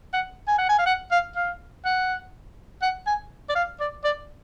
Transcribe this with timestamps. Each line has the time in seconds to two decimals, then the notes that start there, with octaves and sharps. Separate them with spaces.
0.13 F#5
0.47 G#5
0.58 F#5
0.69 G#5
0.78 F5
0.86 F#5
1.11 F5
1.36 F5
1.85 F#5
2.82 F#5
3.07 G#5
3.49 D5
3.55 F5
3.80 D5
4.04 D5